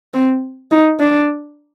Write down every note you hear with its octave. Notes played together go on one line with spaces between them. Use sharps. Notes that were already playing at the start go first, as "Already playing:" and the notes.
C4
D#4
D4